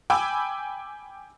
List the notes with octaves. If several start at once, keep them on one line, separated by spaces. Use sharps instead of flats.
G5 G#5 B5 D6 E6